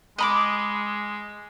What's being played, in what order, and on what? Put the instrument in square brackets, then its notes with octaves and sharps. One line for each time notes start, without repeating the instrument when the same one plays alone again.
[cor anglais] G#3 [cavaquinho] D#5 B5 D6